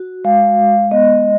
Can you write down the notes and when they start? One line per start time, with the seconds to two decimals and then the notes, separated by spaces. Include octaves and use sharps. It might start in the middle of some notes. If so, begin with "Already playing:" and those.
Already playing: F#4
0.24 G#3 F5
0.58 G#3
0.91 B3 D#5